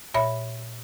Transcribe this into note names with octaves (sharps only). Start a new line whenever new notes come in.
A#2 C#5 E5 B5